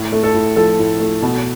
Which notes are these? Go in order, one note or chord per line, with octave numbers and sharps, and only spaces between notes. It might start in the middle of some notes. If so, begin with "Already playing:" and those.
Already playing: A2
A3
A4
A2
F3 A4
A2
A3
B2